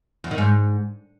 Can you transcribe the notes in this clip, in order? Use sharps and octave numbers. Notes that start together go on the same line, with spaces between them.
E2
D#3
G#2